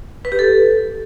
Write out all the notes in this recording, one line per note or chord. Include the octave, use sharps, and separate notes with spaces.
B4
G4
A4